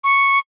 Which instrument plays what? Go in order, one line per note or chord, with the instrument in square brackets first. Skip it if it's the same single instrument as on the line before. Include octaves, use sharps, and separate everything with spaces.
[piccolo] C#6